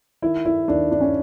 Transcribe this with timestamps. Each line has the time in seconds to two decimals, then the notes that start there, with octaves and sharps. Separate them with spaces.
0.22 D#3 E4
0.45 E4
0.68 D#2 D4
0.91 D4
1.00 C#4